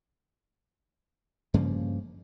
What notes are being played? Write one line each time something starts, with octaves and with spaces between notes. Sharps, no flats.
G2 C#3 F3 A#3